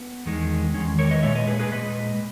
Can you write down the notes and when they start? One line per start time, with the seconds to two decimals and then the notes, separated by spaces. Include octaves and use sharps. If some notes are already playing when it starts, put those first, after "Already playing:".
Already playing: B3
0.26 E2 D#3 G#3
0.74 E2 D#3 G#3 C#4
0.99 A#4 C#5
1.10 B4 D#5
1.23 A#2 G#3 C#5 E5
1.35 B4 D#5
1.47 G#4 B4
1.59 G#4 B4
1.72 A#2 G#3 B4 D#5